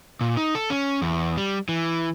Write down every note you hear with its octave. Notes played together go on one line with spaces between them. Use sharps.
A#2
D#4
A4
C#4
E2
G3
E3